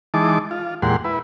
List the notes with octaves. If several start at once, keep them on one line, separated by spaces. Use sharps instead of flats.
E3 G#3 D#4 A5 D6
F4
E2 A#2 G#3 G4 F#5 C6
E4 B4